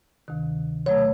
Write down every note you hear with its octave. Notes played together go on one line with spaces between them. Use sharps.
D2 C3 D#3
B2 F#3 A3 C#5